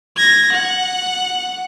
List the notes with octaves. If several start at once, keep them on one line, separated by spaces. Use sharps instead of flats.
G#6 A#6
F#5